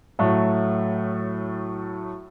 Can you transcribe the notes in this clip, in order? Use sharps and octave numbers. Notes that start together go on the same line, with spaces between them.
A2 F#3 A3